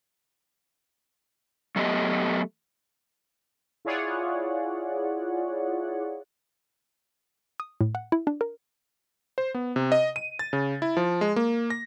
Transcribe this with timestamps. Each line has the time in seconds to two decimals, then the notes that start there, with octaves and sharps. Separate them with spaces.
1.76 F#3 A3 B3 G4 D#5
3.85 E4 F4 G#4 C#5 D5 F#5
7.60 D#6
7.81 A2
7.95 F#5
8.12 E4
8.27 D4
8.41 A#4
9.38 C5
9.54 B3
9.76 C3
9.92 D#5
10.16 D#7
10.39 A6
10.53 C#3
10.82 E4
10.97 F3
11.21 G#3
11.36 A#3
11.70 A#6